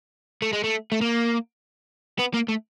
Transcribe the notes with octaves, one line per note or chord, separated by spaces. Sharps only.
A3
G#3
A3
A3
A#3
B3
A#3
A3